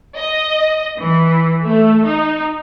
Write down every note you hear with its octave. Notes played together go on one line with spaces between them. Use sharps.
D#5
E3
A3
D#4